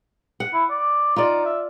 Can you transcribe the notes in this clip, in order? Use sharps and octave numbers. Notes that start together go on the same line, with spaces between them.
F#5
E4
D5
D#4 F4 D5
E5